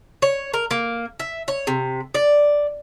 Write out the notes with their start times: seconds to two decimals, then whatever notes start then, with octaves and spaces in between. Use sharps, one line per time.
0.22 C#5
0.54 A#4
0.71 A#3
1.20 E5
1.48 C#5
1.67 C3
2.14 D5